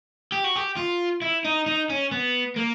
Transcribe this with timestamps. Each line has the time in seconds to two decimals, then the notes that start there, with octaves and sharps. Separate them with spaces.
0.32 G4
0.44 F#4
0.56 G4
0.77 F4
1.22 E4
1.45 D#4
1.66 D#4
1.89 C#4
2.11 B3
2.57 A#3